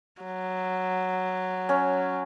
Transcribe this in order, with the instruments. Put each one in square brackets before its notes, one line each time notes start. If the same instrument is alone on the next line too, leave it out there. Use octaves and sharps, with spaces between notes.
[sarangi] F#3
[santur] C#4